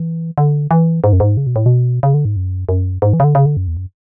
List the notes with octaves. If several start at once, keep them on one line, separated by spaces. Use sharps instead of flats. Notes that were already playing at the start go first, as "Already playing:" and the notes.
Already playing: E3
D3
E3
G#2
F#2
G#2
C#3
B2
A2
B2
C#3
D3
G#2
F#2
F#2
G#2
E3
C#3
D3
C#3
D3
F#2
E2
F#2